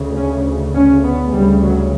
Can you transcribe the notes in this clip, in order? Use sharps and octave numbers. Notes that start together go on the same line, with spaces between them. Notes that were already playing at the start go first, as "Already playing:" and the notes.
Already playing: D2 C#3
C#4
C#4
B3
D2 C#3 G3
F#3